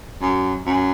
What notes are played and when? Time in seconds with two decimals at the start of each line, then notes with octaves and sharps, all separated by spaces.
0.22 F#2
0.66 F#2